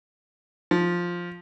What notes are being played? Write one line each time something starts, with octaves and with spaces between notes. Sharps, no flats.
F3